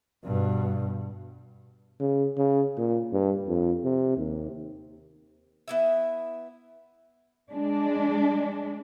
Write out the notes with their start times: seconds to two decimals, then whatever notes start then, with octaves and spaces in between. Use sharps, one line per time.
0.25 G2 B2
2.00 C#3
2.37 C#3
2.78 A#2
3.13 G2
3.47 F2
3.84 C3
4.17 D#2
5.68 B3 E4 E5
7.51 G#3 D4